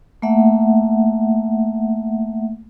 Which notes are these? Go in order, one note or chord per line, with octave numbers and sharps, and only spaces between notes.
A3 A#3 E5 F#5